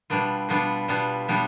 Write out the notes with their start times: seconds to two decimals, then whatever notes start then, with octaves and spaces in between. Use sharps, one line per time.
0.10 B2 G3 B3 D4 F4
0.49 B2 G3 B3 D4 F4
0.88 B2 G3 B3 D4 F4
1.28 B2 G3 B3 D4 F4